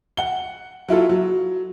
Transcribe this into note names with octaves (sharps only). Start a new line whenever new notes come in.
F#5 G7
F#3 E4 F4 A4
F#3